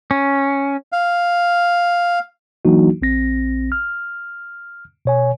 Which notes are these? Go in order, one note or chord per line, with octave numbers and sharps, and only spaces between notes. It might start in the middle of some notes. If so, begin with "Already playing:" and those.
C#4
F5
E3 F#3 A#3 D4 D#4 F#4
A#1 C4 A#6
F6
B2 C#5 G#5